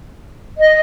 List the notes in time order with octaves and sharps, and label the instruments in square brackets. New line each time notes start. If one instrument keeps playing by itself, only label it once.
[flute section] D#5